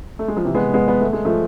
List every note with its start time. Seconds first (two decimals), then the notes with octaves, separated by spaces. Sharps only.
0.19 A3
0.28 G#3
0.37 F3
0.45 C3 E3
0.55 G#3 B3
0.74 G#3 B3
0.88 B3
1.01 A3
1.13 G#3
1.25 F3 A3